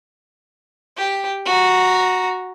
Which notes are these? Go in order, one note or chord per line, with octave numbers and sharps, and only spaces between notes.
G4
F#4 A#5